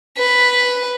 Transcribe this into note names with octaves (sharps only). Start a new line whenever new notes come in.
B4